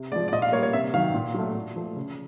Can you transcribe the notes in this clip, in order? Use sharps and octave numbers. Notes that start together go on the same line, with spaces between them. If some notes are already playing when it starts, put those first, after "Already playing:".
Already playing: C3
F3 G#3 D5
D5
A#2 D#5
F5
G3 A#3 C#5
C#5
C3 E5
D#3 F#3 F5
A#2
F#3 A3
A#2
F3 A3
C#3